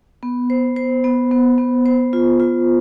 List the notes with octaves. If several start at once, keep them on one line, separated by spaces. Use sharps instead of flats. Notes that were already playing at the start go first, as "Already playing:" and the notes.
B3
C5
C5
B3
B3
B3
C5
F4
F4